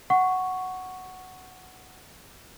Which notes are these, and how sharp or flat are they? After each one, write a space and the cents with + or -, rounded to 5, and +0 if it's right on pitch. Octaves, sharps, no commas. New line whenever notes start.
F#5 +0 C#6 +0